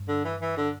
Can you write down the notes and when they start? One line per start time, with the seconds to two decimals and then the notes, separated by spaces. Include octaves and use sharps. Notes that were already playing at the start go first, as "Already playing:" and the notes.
Already playing: G2
0.08 D3
0.24 E3
0.41 E3
0.57 D3